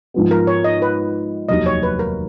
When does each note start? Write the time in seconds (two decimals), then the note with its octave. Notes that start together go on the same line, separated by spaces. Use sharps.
0.14 G#2 F3 B3
0.31 A#4
0.47 C#5
0.64 D#5
0.82 B4
1.49 F1 D#2 D#3 F#3 D#5
1.66 C#5
1.83 B4
1.99 A#4